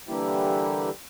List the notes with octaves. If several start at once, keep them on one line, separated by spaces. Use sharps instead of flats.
D3 E3 G3 A#3 E4 G4